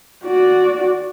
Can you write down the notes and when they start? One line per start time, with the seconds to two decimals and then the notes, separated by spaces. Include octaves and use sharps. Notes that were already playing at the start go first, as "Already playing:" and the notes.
0.24 F#4 D5